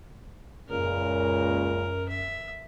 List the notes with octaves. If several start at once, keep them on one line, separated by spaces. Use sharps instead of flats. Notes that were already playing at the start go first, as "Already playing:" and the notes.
C#2 F#2 A#2 C#3 A#4
E5